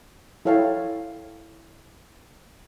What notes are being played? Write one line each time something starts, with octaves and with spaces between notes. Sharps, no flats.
E4 A4 C#5 F5 G5 A5